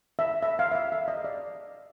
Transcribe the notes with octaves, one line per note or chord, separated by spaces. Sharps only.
E5
E5
F5
E5
F5
E5
D#5
D5